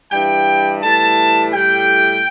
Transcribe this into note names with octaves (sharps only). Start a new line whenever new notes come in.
G2 E3 G3 G5
A2 E3 G3 A5
A2 G3 G5